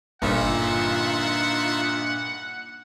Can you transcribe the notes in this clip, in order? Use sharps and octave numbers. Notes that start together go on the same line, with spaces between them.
G1 G2 A#2 D#4 F4 E5 F#5